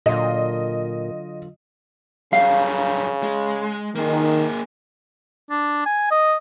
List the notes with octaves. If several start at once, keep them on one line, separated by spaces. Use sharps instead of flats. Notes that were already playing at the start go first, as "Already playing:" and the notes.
A#2 D3 F#3 F4 D#5
F#2 C#3 G3 F5
G#3
D#3 A#3 G#4
D4
G#5
D#5